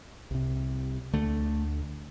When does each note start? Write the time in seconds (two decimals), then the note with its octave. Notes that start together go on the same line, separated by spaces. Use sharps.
0.31 C2 C3
1.13 D2 D3 A3